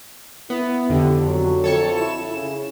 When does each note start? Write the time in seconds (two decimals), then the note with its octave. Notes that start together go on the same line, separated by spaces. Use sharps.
0.50 B3 E4
0.89 F2 D3 G4
1.25 F#3
1.64 F2 A4 C#5 A5
1.97 E4 E7
2.32 C#3